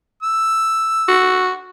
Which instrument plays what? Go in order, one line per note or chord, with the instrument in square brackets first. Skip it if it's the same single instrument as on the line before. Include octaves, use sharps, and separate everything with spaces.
[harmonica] E6
[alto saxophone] F#4